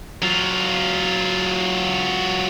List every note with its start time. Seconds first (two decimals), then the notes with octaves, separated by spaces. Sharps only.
0.23 F#3 F4